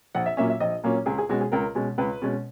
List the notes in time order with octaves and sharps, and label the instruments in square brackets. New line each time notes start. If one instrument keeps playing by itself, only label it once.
[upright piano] A#1 F#5
E5
A#2 F#3 A#3 C#4 E5
E5
A#1 D#5
A#2 F#3 A#3 C#4
C#2 G#4
G#4
B2 G#3 C#4 F#4
G#4
C#2 A#4
B2 G#3 C#4
C#2 B4
B2 G#3 C#4